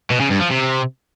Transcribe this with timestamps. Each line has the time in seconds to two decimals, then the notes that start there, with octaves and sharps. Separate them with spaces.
0.10 B2
0.20 C#3
0.30 G2
0.40 F3
0.50 C3